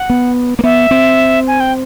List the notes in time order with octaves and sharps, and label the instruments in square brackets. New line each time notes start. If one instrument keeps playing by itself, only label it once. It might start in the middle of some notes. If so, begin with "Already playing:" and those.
Already playing: [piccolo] F#5
[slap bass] B3
A#3
[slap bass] B3 [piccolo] E5
[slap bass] C4
[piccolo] G#5
G5